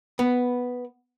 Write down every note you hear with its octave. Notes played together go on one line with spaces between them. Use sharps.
B3